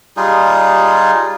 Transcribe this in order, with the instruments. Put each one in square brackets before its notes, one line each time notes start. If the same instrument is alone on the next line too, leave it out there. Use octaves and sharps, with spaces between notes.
[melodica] G3 D#4 F4 G#4